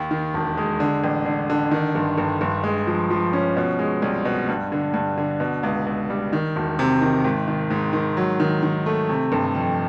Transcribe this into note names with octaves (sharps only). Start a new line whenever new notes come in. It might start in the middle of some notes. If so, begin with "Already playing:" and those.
Already playing: D#2
D#3
E1
G#3
D3
A1
D3
D3
D#3
G1
G1
G1
G#3
F3
F3
C#4
B2
G#3
C2
B2
G2
D3
G2
D3
B2
C#2
C#2
G3
D#3
E1
C3
D#3
G#1
D#3
G#2
D#3
F#3
D#3
D#3
A3
C3
G1
F2